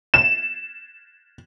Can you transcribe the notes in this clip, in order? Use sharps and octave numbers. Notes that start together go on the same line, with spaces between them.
E7